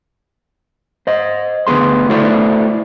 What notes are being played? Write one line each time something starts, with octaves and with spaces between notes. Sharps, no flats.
C5 D#5
D2 B2 B3 G#4 C6
A3 E4 F#4 A4 C5 D5